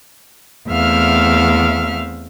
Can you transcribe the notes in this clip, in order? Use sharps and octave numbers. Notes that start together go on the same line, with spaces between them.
E2 A3 C4 E5 F5 F6